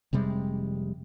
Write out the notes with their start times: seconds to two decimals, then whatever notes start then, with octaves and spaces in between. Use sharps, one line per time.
0.13 F1 C3 G3 G#3